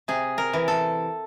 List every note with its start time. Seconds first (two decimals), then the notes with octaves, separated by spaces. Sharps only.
0.08 C3 G#4
0.38 A#4
0.53 E3
0.68 A4